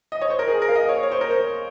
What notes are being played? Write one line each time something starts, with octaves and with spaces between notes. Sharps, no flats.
D#5
C#5
C5
A#4
G#4
A#4
F5
D#5
C#5
C#5
C5
A#4
C5